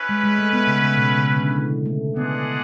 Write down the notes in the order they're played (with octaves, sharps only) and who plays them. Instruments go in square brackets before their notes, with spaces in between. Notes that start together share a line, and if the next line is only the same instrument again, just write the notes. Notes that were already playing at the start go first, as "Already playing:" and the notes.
Already playing: [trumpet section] C#4 E4 B4
[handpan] G#3
G#3
A3
B3
C#3
C#3
B2
C#3
D3
E3
A3
[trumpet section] G#3 D4 G#4 D5 F#5 [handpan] B3